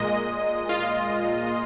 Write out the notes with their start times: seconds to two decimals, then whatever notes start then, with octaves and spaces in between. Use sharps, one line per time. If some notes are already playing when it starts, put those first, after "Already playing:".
Already playing: A#2 G#3 D#5
0.69 F4